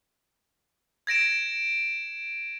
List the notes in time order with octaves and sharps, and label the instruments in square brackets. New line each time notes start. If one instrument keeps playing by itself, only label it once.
[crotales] G#6 A#6 D7 E7